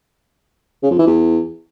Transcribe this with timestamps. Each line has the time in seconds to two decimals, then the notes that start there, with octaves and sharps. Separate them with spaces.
0.83 C#3
0.91 F2
0.99 E3
1.07 E2